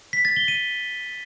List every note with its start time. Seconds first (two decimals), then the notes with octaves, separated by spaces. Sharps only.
0.13 B6
0.25 A6
0.36 G7
0.48 D#7